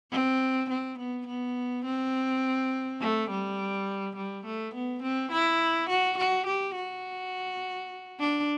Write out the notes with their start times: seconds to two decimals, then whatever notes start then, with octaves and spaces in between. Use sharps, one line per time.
0.11 C4
0.70 C4
0.98 B3
1.27 B3
1.84 C4
3.01 A3
3.30 G3
4.16 G3
4.45 A3
4.74 B3
5.03 C4
5.31 E4
5.89 F#4
6.18 F#4
6.46 G4
6.75 F#4
8.20 D4